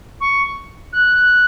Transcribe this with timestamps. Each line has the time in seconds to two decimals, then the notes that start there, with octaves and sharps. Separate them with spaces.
0.20 C#6
0.93 F#6